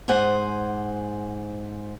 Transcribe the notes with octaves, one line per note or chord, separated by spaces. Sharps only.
G#2 G#4 C5 F#5 G#5